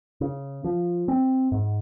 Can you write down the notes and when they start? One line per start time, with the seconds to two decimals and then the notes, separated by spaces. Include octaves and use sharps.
0.21 C#3
0.64 F3
1.08 C4
1.52 G#2